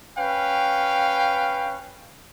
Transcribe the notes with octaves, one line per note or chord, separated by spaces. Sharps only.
C#4 B4 F5 G5